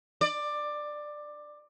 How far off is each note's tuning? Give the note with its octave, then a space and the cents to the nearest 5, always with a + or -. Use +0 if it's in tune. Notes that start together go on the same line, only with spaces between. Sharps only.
D5 +15